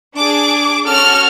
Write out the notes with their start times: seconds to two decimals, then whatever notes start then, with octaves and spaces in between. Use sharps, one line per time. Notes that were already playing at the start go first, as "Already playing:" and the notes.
0.16 D4 G#4 D6
0.86 C#4 F#4 A4 F6